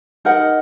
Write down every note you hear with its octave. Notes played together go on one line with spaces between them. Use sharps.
D#4 A#4 D#5 F#5